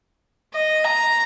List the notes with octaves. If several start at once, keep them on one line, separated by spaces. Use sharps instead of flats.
D#5
A#5